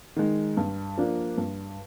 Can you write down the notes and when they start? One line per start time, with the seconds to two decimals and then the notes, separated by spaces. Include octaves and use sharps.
0.16 D#3 G#3
0.57 G2
0.98 F3 A#3 D4
1.38 G2